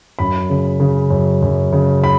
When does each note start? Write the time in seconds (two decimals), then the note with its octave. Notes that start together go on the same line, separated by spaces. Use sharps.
0.19 F#2 B5
0.50 C#3
0.80 C#3
1.10 F#2
1.42 F#2
1.72 C#3
2.04 B5